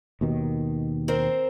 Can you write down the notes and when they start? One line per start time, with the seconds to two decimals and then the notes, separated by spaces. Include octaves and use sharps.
0.21 D#2 B2 D#3
1.08 C4 A#4 C5